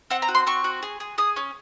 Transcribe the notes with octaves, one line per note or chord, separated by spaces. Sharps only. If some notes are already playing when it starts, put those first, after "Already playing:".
C4 F#5
A#5
F#4
C6
C4 C#6
F#4
G#4
G#4
G#4 D#6
C#4